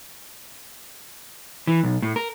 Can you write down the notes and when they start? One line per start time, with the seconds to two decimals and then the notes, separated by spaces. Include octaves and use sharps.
1.67 E3
1.83 B1
2.02 A2
2.16 A#4